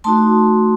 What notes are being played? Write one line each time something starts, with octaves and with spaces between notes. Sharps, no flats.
A3 D#4 F#4 A5 C6